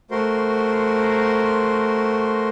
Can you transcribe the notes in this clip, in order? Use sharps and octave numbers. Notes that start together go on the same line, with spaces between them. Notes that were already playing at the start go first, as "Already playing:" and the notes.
A3 F#4 A#4 C5 C6